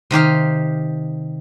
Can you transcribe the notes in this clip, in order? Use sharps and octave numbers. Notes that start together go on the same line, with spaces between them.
C3 D#3 G4 F5